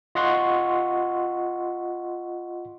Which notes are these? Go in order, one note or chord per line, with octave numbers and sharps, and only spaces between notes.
F4 D#5 F#5 C6 C#6